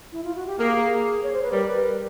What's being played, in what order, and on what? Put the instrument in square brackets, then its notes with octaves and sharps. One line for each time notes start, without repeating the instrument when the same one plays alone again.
[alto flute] E4
F4
F#4
G4
[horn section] A#3 [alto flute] G#4
[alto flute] C#5
C5
B4
[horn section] G3 [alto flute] A#4
[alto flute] B4
A#4